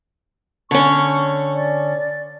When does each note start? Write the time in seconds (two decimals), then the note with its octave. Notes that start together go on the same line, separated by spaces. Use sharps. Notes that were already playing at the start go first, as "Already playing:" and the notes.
0.71 D3 C#4 C#6
1.53 D5